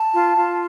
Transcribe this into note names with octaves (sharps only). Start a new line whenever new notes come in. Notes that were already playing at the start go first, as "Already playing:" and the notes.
Already playing: A5
F4
F4